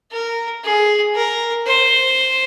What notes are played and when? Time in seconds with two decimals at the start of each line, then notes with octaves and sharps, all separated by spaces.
0.12 A#4
0.64 G#4
1.16 A#4
1.67 C5